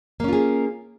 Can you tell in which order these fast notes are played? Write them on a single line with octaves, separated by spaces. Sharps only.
A#3 C#4 F4 G#4